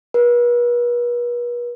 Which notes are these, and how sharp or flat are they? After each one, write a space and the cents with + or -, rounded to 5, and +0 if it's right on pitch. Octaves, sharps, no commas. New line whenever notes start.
B4 -40